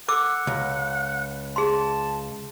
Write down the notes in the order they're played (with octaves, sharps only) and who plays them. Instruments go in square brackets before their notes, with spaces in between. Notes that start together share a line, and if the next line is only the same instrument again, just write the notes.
[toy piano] A4 D6 E6 [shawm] F#5
[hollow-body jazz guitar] C#2
[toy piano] G#4 C6 [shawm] A5